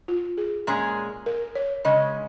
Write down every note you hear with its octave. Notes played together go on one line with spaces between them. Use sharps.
F4
G#4
A#2 G#3 C#4 G#4
A#4
C#5
C#3 G#3 C#4 D#5